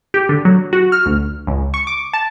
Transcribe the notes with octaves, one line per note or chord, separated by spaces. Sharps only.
G4
D3
F#3
F#4
F6
D2
C#2
C#6
D6
A5